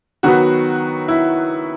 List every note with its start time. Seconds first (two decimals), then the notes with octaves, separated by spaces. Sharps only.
0.23 D#3 F#3 B3 F#4
1.08 E4